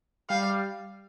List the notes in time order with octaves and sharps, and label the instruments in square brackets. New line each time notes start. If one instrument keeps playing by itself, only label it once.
[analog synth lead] G3 [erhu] F5